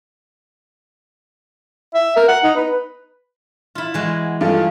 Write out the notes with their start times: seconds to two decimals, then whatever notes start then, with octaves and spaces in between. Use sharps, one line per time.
1.94 E5
2.16 A#4
2.28 F#5
2.44 D#4
2.56 B4
3.75 E4 F4
3.94 E3 G#3 F#4
4.41 G2 F3 A4